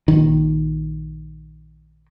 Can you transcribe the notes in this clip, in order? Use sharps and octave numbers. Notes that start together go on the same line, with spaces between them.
A#1 D#3